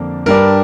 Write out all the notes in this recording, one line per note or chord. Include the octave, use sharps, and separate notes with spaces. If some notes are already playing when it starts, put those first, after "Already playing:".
Already playing: F2 D3 A#3 D4
G2 G3 D4 A#4